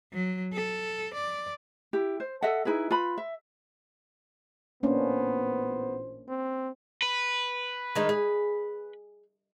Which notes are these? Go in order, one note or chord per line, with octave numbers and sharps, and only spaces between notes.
F#3
A4
D5
E4 G4
C5
A4 D#5 E5 F#5
D#4 E4 G#4 B4
F4 B4 B5
E5
A1 A#2 A#3 B3 C#4 D4 C5
C4
B4
D#3 G#3 D#4
G#4